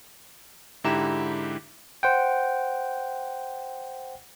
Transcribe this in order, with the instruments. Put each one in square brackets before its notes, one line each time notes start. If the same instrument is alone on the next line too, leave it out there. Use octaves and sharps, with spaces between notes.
[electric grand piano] G#2 D3 E4 G4 A#5 E7
[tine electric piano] C5 F#5 G5